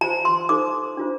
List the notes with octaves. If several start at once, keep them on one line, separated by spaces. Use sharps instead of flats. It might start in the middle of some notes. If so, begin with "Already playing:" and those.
F4 C5 A#5
C6
D#4 A4 C5 D6
D4 F4 C5